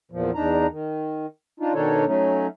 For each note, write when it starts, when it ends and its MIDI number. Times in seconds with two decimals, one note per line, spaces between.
0.11 0.31 40
0.11 0.31 46
0.11 0.31 53
0.35 0.67 40
0.35 0.67 62
0.35 0.67 63
0.35 0.67 82
0.71 1.26 51
1.60 1.74 62
1.60 1.74 63
1.60 1.74 65
1.74 2.05 47
1.74 2.05 51
1.74 2.05 62
1.74 2.05 63
1.74 2.05 69
1.74 2.05 73
2.06 2.47 54
2.06 2.47 57
2.06 2.47 61
2.06 2.47 63